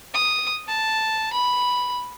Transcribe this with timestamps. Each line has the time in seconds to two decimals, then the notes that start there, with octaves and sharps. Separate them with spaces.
0.14 D#6
0.68 A5
1.33 B5